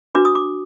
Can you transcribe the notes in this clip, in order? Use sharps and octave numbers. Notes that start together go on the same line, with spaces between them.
D4 F#4 B4 D6
D#6
D6